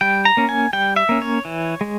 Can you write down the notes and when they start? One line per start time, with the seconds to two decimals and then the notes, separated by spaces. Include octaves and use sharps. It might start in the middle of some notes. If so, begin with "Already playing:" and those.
0.01 G3 G5
0.25 A#5
0.37 A#3 C#4
0.49 G#5
0.73 G3 G5
0.96 E5
1.09 A#3 C#4
1.22 C#5
1.45 E3
1.81 G#3